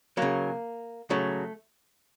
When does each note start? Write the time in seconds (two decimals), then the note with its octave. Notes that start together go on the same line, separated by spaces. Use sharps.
0.17 C#3 F#3 A#3
1.10 C#3 F#3 A3